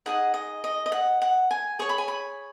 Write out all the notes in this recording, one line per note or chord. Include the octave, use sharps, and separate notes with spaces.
D#4 G#4 D#5 F#5
D#5
D#5
D#5
F#5
F#5
G#5
G#4 C#5 C#6
B5
G#5
B5